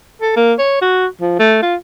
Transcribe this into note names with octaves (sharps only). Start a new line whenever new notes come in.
A4
A#3
C#5
F#4
F3
A3
F4